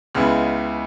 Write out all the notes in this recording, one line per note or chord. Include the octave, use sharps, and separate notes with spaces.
C#2 C#3 G#3 B3 E4